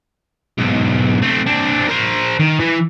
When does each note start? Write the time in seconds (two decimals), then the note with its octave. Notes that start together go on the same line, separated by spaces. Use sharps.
0.58 B1 G#2
1.22 A3 C4
1.46 C4 D4
1.89 A#4 C5
2.40 D#3
2.60 E3